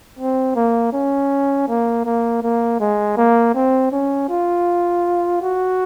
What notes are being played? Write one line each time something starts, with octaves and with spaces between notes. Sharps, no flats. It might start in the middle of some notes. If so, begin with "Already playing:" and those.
C4
A#3
C#4
A#3
A#3
A#3
G#3
A#3
C4
C#4
F4
F#4